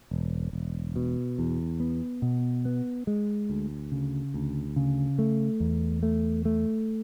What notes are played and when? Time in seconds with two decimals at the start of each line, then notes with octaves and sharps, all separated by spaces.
0.11 E1
0.53 E1
0.96 B2
1.39 E2
1.80 B3
2.22 B2
2.65 B3
3.07 G#3
3.50 D2
3.92 C#3
4.34 D2
4.76 C#3
5.19 A3
5.60 E2
6.03 A3
6.45 A3